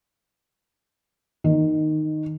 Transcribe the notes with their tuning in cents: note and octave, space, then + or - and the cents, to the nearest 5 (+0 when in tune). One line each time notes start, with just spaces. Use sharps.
D#3 -10